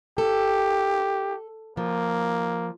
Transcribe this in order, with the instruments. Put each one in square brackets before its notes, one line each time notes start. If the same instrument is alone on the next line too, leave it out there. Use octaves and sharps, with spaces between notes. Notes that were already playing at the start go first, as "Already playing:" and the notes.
[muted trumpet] G4 [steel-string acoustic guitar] A4
[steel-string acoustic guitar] F3 [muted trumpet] A#3